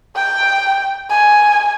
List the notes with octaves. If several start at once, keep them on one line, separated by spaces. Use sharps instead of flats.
G5
G#5